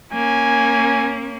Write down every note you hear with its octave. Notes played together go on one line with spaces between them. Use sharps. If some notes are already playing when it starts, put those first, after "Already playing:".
A#3 C#4 G#5